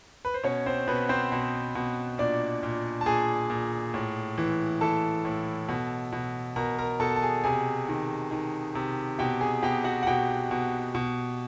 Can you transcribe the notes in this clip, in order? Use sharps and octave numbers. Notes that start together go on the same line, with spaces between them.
B4
C5
B2 C#4 C#5
C4 C5
B2 B3 B4
C4 C5
B2
B2
A#2 D4 D5
A#2
A5
A#2 G#4 G#5
A#2
A2
E3
E3 A4 A5
A2
B2
B2
B2 A#4 A#5
A#4 A#5
B2 A4 A5
A5
G#4 G#5
C3 G#4 G#5
D#3
D#3
C3
B2 G4 G5
G#4 G#5
B2 G4 G5
F#4 F#5
F#5
B2 G4 G5
B2
B2